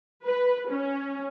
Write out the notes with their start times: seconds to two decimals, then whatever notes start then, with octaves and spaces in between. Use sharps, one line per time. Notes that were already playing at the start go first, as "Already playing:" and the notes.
0.24 B4
0.69 C#4